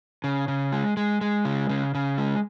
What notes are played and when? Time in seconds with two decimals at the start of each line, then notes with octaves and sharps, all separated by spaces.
0.24 C#3
0.48 C#3
0.72 G#3
0.97 G#3
1.21 G#3
1.45 C#3
1.69 C#3
1.95 C#3
2.18 G#3